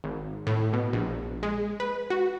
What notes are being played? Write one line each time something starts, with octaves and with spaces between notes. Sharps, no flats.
G#1
A2
B2
A#1
G#3
B4
F#4